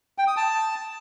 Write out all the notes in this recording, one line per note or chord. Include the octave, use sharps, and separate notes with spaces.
G5
D#6
A5